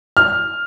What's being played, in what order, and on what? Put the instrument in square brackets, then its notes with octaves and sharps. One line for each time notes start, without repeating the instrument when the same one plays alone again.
[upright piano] F6